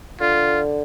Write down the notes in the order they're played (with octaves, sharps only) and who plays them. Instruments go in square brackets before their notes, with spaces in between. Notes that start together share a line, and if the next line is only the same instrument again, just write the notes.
[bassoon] D3 [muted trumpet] F4